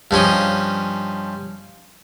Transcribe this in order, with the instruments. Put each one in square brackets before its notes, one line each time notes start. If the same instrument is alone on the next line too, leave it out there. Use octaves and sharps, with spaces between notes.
[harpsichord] G2 F3 C#4 D#4